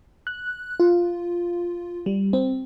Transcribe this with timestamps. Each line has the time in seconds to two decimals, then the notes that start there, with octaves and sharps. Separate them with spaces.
0.27 F#6
0.80 F4
2.06 G3
2.33 C4